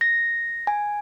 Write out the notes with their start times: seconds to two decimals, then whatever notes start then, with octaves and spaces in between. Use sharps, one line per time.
0.01 A#6
0.67 G#5